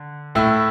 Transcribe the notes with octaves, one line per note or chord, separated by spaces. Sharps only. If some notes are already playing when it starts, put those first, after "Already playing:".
Already playing: D3
A2 A3 E4 E6